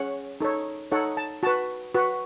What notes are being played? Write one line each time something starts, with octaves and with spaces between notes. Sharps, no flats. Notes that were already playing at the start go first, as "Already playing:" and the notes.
Already playing: C#4 G#4 C#5 F#5
D#4 A4 C#5
D#4 A4 C#5 F#5
A5
F#4 B4 A5
F#4 B4